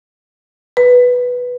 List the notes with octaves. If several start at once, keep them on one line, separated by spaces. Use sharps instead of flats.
B4